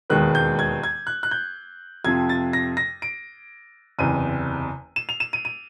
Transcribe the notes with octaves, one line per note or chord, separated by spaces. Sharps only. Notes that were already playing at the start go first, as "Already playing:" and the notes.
E1 D#2 D#3 G#3 B3 F#6
G6
G#6
G#6
F#6
F#6
G6
F2 C3 F3 G#6
A6
A#6
A#6
D7
F#1 E2 C3 D#7
E7
F7
E7
D#7
D#7